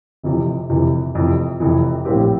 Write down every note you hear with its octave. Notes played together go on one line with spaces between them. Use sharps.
F1 F2 C3 E3
F1 F2 C3 E3
F1 F2 C3 E3
F1 F2 C3 E3
A#1 A2 F3 C4 G4